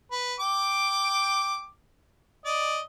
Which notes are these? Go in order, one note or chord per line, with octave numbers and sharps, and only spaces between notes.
B4
G5 D6
D5 D#5